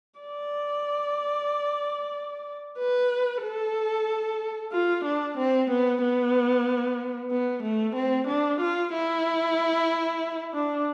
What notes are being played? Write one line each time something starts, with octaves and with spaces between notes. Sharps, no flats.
D5
B4
A4
F4
D4
C4
B3
B3
B3
A3
C4
D4
F4
E4
D4